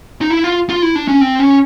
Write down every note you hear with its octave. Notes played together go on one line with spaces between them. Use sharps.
D#4
E4
F4
F4
E4
D4
C#4
C4
C#4